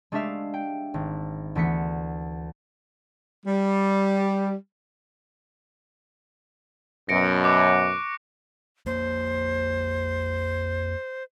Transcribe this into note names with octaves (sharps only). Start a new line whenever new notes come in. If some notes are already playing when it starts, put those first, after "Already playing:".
G#3 A3 D4 G4 E5 F5
G5
G#1
D2 E3 B3 B6 C#7
G3
F#2 B2 A#6 C#7 D7
C#6 D6 F#6
F2 A#3 C5